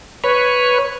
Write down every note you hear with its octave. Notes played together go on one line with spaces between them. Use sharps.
B4 C#5